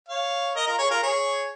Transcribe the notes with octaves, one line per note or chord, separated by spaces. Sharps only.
C#5 F5
A#4 D#5
F4 A#4
G#4 C#5
F4 A#4
G#4 C#5